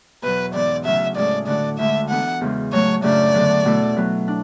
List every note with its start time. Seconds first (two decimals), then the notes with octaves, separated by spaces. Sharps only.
0.22 E2 B2 F#3 B4
0.54 G#2 E3 B3 D5
0.85 D2 C#3 F#3 C#4 F#4 E5
1.16 A2 G#3 C#4 G#4 D5
1.47 D3 A3 D4 F#4 D5
1.79 D2 D3 G#3 E5
2.09 E3 B3 D4 A4 F#5
2.41 E2 C#3 G#3
2.72 A2 F#3 A3 C#5
3.01 F#2 C#3 F#3 A3 D4 D5
3.34 E2 D3 F#3
3.65 B2 A3 E4 A4
3.96 B2 F#3 B3
4.28 D4